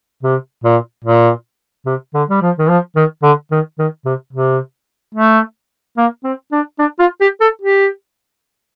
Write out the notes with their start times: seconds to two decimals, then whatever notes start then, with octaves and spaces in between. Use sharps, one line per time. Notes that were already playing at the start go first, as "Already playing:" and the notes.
0.23 C3
0.64 A#2
1.04 A#2
1.86 C3
2.14 D3
2.30 G3
2.42 F3
2.58 D#3
2.69 F3
2.96 D#3
3.23 D3
3.51 D#3
3.78 D#3
4.05 C3
4.33 C3
5.15 A3
5.97 A#3
6.24 C4
6.52 D4
6.79 D4
6.99 F4
7.21 G4
7.41 A4
7.61 G4